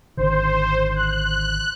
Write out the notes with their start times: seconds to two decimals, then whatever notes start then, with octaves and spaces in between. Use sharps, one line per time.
0.17 G#1 D3 D#3 C5
0.96 F#6